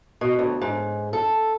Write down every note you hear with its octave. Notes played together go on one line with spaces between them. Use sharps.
B2
D2
G#2
A4